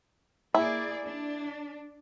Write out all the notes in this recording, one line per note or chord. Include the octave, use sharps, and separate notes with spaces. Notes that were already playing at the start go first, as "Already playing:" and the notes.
A#3 E4 G#4 D5
D4